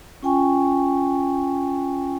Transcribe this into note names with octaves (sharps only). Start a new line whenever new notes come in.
C#4 F4 G5 G#5 C#6